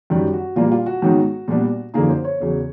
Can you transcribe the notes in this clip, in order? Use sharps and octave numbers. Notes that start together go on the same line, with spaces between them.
F#2 D#3 G3
F#4
A#2 G3 A#3 F4
F4
F#4
G#2 D#3 F#3 B3 D#4
A#2 G3 B3 D4
F#2 D3 F3 A#3 D#4 G#4
C5
C#5
E2 C#3 F#3